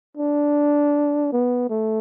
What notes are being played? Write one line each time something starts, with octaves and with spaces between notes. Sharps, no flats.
D4
B3
A3